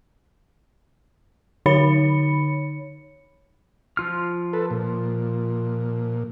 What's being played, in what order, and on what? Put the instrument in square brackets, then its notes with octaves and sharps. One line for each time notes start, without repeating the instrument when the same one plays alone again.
[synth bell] D3 D#4 C#5 B5 C#7
[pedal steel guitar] F3 F4 F6
[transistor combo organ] A4 B4
A#2